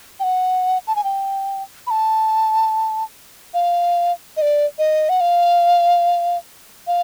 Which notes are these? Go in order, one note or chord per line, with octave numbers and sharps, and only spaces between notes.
G5
F#5
A5
G#5
G5
B5
A5
F5
D#5
D5
D#5
F#5
F5
F5